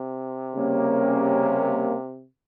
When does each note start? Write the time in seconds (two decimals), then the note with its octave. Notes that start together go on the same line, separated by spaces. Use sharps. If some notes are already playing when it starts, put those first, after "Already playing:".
Already playing: C3
0.55 C#3 G3 A#3 C#4